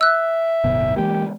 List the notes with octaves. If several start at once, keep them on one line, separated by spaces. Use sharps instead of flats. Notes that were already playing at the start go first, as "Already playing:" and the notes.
E5 E6 F#6
D1 G1 B2
E3 G#3 A#3 G4